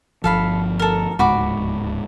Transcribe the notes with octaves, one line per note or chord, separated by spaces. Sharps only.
G1 C2 F3 A4 F5 B5
A4 A#4
D1 C#2 G#2 F#4 B5 D6